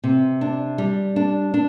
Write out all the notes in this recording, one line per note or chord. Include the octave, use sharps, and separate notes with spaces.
C3
D4
G3
D4
D4